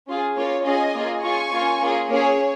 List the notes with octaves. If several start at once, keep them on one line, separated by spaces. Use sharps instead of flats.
C#4 F4 G#4
A#3 C#4 F4 C#5
C#4 F4 G#4 D#5 G#5
A#3 F4 G#4
C#4 F4 G#4 G#5 C#6
A#3 C#4 F4
A#3 C#4 F4 G#4
A#3 C#4 G#4 C#5